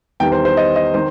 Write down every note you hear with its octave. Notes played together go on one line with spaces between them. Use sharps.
E2 D#3 G3 G5
C5
C5
D#5
D#5
D#3 C5